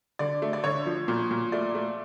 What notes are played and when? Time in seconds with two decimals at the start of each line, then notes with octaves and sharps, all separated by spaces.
0.19 D3 D5
0.42 A3
0.53 D5
0.64 D3 C#5
0.86 F3
1.08 A#2
1.31 A#2
1.52 A3 D5
1.75 A3